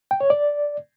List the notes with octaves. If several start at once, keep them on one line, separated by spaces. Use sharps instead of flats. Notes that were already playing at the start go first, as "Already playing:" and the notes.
G5
C#5
D5